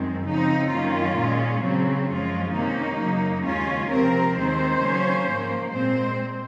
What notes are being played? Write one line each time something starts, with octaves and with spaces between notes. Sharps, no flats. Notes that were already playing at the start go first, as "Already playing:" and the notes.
Already playing: F#2 D#3 G#3 C4
C#3 F3 C4 D#4
F#2 D#3 A#3 C#4 F4
A#2 G#3 C#4
C#3 F#3 C4
F#2 F3 G#3 C#4 F4
C3 D#3 A#3 C#4 D#4
F#2 C#3 F#3 A#3
D#2 C#3 G#3 C#4 F4
C3 F3 C4 A#4
D#2 D#3 G#3 C4 C5
C#3 F#3 A#3 C#4
G#2 F3 A#3
A#2 G#3 C4 C5